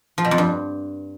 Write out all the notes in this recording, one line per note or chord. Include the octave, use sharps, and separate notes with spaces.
F3
B2
F2
G2